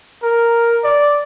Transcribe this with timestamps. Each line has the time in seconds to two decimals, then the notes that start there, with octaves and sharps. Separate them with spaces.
0.23 A#4
0.84 D5